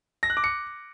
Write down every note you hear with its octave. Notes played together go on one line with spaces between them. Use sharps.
A#6
F#6
D6
C#7